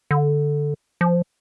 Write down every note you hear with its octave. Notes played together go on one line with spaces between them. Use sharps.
D3
F3